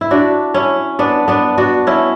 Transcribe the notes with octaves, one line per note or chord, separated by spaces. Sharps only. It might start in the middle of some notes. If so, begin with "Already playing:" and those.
E4
D4 F#4
C#4 E4
B3 D4
B3 D4
D4 F#4
C#4 E4